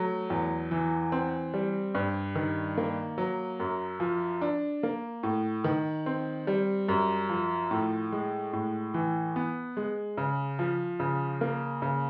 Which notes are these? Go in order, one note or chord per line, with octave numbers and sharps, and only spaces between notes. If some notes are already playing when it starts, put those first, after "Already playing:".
Already playing: F#3 A3
E2
E3
C4
G3
G2
D#3
A#3
F#3
F#2
F3
D4
A#3
A2
D#3
C4
G3
F#2
F3
A2
G#3
A2
E3
B3
G#3
C#3
F3
C#3
A#3
C#3